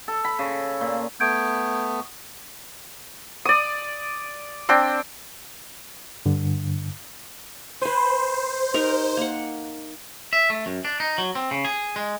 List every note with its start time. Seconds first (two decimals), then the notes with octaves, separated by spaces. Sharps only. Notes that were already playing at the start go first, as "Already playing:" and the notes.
0.08 A4
0.25 B5
0.39 C#3
0.81 A#2
1.20 A3 B3 G6 G#6 D7
3.45 D5 D#6
4.69 C4 D4 G5
6.26 G2 D3
7.81 B4 C5 G#5
8.74 D#4 G4 A#4
9.17 A#3 F#5
10.33 E5
10.50 A3
10.66 F#2
10.85 D4
11.00 D#4
11.18 F#3
11.35 C4
11.51 C#3
11.65 G#4
11.96 G#3